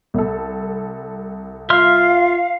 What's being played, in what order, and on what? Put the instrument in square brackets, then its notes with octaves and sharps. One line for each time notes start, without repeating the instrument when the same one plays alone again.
[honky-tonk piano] C2 A4
[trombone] F4 [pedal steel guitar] E5 C6 F6 [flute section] F5